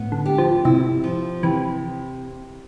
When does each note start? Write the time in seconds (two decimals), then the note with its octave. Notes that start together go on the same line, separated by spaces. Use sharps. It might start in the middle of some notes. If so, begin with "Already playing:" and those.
Already playing: A2 B3
0.12 D3
0.26 G4
0.38 F3
0.65 C3 E4
1.04 F3
1.43 C3 E3